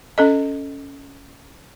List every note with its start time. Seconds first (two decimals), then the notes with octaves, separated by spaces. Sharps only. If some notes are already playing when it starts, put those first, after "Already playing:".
0.18 C#4 A4 D#5